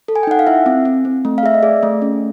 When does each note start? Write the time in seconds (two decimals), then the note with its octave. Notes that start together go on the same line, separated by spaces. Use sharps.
0.08 A4
0.16 G#5
0.23 G5
0.27 D#4 F#5
0.39 F5
0.47 E4 E5
0.66 C4
0.85 C4
1.05 C4
1.25 A3
1.38 F5
1.43 G#4 E5
1.54 D#5
1.63 G#4 D5
1.83 A3
2.02 C#4